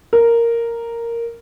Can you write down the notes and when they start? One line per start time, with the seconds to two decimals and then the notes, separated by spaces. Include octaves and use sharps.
0.13 A#4